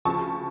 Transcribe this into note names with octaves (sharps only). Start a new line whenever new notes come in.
D2 C#3 F3 A5 C#6